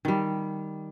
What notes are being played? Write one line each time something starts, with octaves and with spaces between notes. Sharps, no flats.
D#3 G3